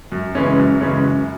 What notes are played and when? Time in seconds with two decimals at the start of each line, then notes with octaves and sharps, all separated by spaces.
0.12 F#2
0.35 C#3 E3 G#3 C#4
0.58 F#2
0.81 C#3 E3 G#3 C#4
1.03 F#2